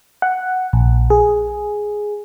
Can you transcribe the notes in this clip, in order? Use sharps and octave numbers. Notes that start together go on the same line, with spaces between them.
F#5
A#1
G#4